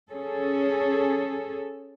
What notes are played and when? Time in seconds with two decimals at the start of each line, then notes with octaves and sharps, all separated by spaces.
0.12 C#4 G#4 A4